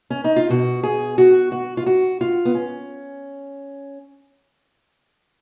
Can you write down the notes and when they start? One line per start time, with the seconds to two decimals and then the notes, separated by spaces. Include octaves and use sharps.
0.10 C#4
0.24 D#4
0.36 F4
0.49 B2 F#4
0.83 G#4
1.18 F#4
1.52 F#4
1.77 F4
1.86 F#4
2.21 F4
2.45 B3
2.55 C#4